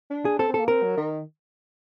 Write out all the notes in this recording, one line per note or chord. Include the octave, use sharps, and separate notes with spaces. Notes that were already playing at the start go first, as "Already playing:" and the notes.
D4
G#4
C4 A4
C4
A4
A#3
C4 A#4
F#3
D#3